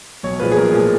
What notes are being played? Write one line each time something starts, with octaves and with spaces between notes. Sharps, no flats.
B1 C#5
A#2 F3 G#3 B4
G#4
B1 A#4
A#2 F3 G#3